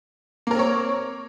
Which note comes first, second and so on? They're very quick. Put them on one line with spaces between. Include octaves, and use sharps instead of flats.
A#3 A#4 C4 C#5